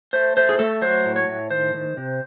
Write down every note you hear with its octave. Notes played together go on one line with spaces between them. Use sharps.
A3 C5
A3 C5
G#4
A3 A4
F#3 C5
A2
C#5
A2
D#3 C5
D#3
C3